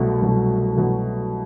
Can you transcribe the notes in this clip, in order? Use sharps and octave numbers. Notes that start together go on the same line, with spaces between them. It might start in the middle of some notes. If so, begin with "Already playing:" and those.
Already playing: C2 B2 F#3 A3
C2 B2 F#3 A3
C2 B2 F#3 A3